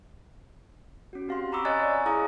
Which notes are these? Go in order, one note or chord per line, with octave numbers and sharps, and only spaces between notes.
C#4 F#4
C4 G4 F5 F#5 C6
A#5 B5 C#6 D6 E6
C#5 D#5 G#5 A#5 F#6 A6
D5
E4 G#4 F5 A#5 D6 D#6